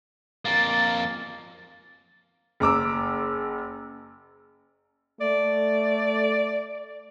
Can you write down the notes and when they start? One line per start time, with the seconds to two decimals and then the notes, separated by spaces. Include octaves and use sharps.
0.45 F2 A#3 A6
2.60 F#1 A#5 D6 E6
5.21 A3 D5